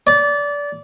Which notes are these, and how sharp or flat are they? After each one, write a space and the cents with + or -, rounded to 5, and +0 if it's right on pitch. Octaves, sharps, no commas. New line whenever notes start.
D5 -25